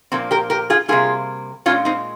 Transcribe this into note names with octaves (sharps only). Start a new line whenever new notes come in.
A#2 F3 A#3 C4
G4 A#4
G4 A#4
F4 G#4
C3 G3 A#3 F4 G#4
A#2 G#3 C#4 F4
C4 D#4